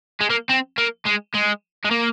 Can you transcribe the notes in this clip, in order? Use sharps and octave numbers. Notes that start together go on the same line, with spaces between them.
G#3
A#3
C4
A#3
G#3
G#3
G#3
A#3